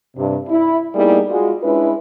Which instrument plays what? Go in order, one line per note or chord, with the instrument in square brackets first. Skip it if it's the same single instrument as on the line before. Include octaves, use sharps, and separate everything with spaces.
[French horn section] G2 C3
E4
G3 A#3 B3 D#4 E4 G#4
G#3 F4 F#4
G#3 C#4 D4 E4 B4